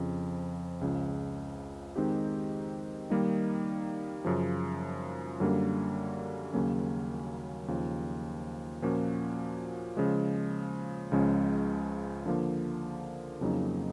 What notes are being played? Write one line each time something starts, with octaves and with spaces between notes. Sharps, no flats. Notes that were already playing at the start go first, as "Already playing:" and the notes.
Already playing: F2 C#3 F3
C#2 C#3 F3
D#3 G#3 C4 D#4 G4
D#3 G3 A#3 D#4
F#2 C#3 F3
F#2 D3 G3 A#3
D#2 C#3 F#3 A#3 C#4
D#2 C#3 F3
A#2 F3 A#3 C#4 F#4
C#3 F3 G#3
C#2 C#3 F3 G#3 C#4
D3 F3 A#3
F2 C#3 F#3 A#3 D#4